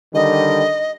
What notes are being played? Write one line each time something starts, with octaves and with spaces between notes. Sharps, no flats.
D3 D#3 G3 D#5